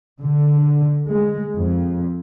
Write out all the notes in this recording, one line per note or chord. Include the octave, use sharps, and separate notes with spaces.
D3
G#3
F2